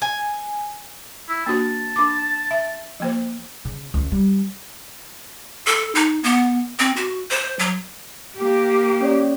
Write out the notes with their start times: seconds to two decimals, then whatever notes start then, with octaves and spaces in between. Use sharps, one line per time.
0.02 G#5
1.29 E4
1.46 A#3 D4 F#4 A5
1.96 D4 D6
2.51 E5
3.00 F3 A#3 C5
3.65 C#3
3.94 C#2
4.12 G3
5.67 A4
5.95 D#4
6.23 B3
6.79 C4
6.96 F#4
7.31 C5
7.59 F#3
8.38 A#3 G4
9.01 C#4 C#5 D5